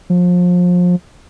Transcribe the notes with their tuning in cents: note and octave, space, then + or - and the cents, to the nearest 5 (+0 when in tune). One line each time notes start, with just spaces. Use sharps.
F3 +30